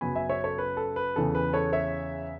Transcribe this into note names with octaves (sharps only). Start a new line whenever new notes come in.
F#2 C#3 F#3 B3 G#5 B5
E5 G#5
C#5 E5
A4 C#5
B4
A4
B4
E2 C#3 E3 A4
B4
A4 C#5
C#5 E5